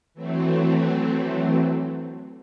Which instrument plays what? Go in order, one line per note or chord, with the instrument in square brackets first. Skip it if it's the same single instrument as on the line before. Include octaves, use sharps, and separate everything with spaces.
[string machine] E3 F#3 A3 C4